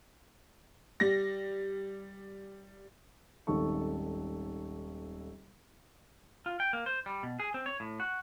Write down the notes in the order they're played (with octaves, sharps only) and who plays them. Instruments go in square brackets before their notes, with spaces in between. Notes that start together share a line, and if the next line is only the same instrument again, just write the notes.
[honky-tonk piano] G3 A#6
[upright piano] D#1 G#1 D#3 A4 C#6
[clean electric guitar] F4
G5
A#3
C5
G3
B2
G#4
C4
C#5
A2
F#4